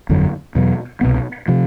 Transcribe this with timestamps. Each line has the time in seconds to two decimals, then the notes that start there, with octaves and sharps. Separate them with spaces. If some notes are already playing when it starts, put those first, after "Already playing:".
0.09 G1 F2 D3 F#3
0.55 E2 B2 F#3
1.01 C2 B2 G3 B3
1.48 C3 F3